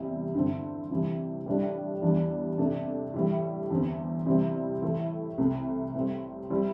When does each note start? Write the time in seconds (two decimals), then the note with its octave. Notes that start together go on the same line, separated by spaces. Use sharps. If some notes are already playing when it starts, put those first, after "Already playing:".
Already playing: E2 C3 G3 E4
0.35 G2 D3 C4 E4
0.91 C3 E3 G3
1.46 A2 G3 D4
2.02 E2 E3 G3 D4
2.58 C3 A3 D4
3.14 A2 E3 G3 E4
3.70 E2 D3 C4 E4
4.26 C3 E3 G3 C4 E4
4.82 A2 E3 A3 E4
5.38 C2 C3 A3 E4
5.94 A2 G3 C4
6.50 G3 C4 E4